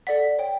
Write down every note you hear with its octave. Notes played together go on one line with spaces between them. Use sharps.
A4 D5 F#5 B6
C#5 G5